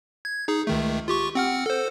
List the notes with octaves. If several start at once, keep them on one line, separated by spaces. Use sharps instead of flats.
G#6
D#4 G#4
C#2 D#3 A3
F4 G4 C#6
C4 F#5 F6
A4 C5